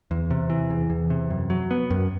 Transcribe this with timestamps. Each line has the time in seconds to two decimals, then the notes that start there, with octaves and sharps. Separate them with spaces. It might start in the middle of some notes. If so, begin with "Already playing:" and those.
0.11 E2
0.31 C3
0.50 E3
0.70 E2
0.90 E2
1.10 C3
1.30 F#2
1.50 F#3
1.71 B3
1.90 F#2